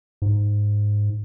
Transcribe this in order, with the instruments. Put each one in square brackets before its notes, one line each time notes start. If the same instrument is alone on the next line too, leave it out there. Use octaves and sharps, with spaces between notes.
[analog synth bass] G#2